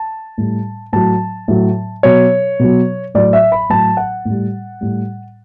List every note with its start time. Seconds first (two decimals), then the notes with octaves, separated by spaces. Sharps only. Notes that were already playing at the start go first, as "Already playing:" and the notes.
Already playing: A5
0.38 A2 G3
0.93 A2 F#3 A5
1.48 A2 F#3
2.03 B2 F#3 C#5
2.60 B2 F#3
3.14 A2 F#3 D5
3.33 E5
3.52 B5
3.70 A2 F#3 A5
3.97 F#5
4.25 A2
4.30 G3
4.81 A2 G3